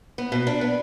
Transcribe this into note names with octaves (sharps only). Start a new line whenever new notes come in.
B3
B2
D4
B3